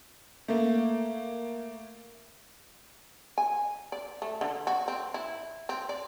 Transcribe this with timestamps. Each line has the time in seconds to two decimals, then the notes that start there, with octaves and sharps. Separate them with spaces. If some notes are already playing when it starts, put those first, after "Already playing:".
0.48 A3 A#3
3.38 G#5
3.92 D5
4.22 A3
4.41 D3
4.67 F#4
4.88 C4
5.14 E4
5.69 C4
5.89 D5